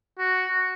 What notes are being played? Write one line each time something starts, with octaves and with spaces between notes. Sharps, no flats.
F#4